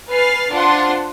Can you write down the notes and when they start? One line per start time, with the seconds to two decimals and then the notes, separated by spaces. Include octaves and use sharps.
0.11 B4 G#5 F6 A6 C7
0.53 D4 F4 C5 F#5 C6